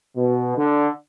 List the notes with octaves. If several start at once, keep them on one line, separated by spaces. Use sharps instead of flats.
B2
D3